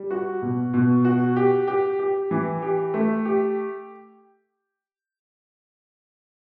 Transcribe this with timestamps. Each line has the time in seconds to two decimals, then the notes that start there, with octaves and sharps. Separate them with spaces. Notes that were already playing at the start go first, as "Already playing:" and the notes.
Already playing: G3
0.11 F#4
0.42 B2
0.74 B2
1.05 F#4
1.36 G4
1.67 G4
1.99 G4
2.31 E3
2.62 G4
2.94 A3
3.25 G4